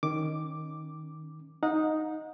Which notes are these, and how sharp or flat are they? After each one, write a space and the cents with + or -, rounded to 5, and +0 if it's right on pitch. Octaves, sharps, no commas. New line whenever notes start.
D#3 +0 C#4 +0 D6 +0
D#4 +0 F#5 -35